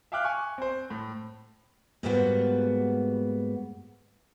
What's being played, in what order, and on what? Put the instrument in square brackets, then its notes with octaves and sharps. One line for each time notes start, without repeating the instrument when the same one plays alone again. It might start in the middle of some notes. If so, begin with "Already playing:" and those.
[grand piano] E5 F5 G5 D6 F6 F#6
G#5 C#6
C4 C5
A2
[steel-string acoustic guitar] G#2 G3 A#3 B3 F#4